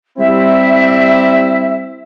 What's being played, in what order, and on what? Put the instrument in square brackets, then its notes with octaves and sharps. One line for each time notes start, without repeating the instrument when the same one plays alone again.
[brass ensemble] G3 C4 E4 [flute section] E5